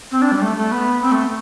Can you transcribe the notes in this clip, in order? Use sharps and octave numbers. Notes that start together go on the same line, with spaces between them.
C4
D4
G3
A3
A3
B3
C4
A3